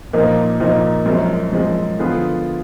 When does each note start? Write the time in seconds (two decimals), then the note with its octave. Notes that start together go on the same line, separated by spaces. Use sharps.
0.13 A#2 F3 A#3 D#4
0.60 A#2 F3 A#3 D#4
1.06 F#2 F3 G#3
1.52 F#2 F3 G#3
1.99 D3 F3 B3 F4 G#4